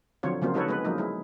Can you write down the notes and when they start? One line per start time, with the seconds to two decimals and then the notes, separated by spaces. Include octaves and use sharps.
0.23 D3 F3 F#3 C4 F4 C#5
0.42 C#3 F3 F#3 A#3 C4 F4
0.54 G#3 D#4 F#4 A4 B4 C#5
0.68 G#3 B3 C#4 B4
0.85 F3 F#3 A#3 D#4
0.98 G#3 E4